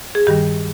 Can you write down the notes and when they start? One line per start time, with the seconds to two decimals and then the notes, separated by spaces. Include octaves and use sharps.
0.15 G#4
0.27 G2 D#3 G3 G4